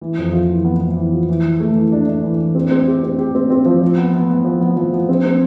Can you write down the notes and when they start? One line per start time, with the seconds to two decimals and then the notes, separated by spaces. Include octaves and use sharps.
0.01 E3
0.18 F2
0.33 F4
0.49 E3
0.65 B3
0.80 B3
0.96 E3
1.13 F4
1.29 E3
1.45 E3
1.60 A3
1.76 E3
1.92 D4
2.08 D4
2.23 E3
2.39 E3
2.55 C4
2.71 C4
2.87 G4
3.03 C4
3.19 G4
3.35 C4
3.50 C4
3.65 F3
3.82 F3
3.97 B3
4.14 B3
4.30 B3
4.45 F3
4.61 B3
4.76 F3
4.93 F3
5.09 C4
5.25 C4